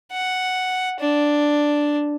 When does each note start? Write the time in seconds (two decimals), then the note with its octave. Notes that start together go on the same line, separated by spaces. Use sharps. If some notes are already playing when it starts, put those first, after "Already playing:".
0.12 F#5
1.00 D4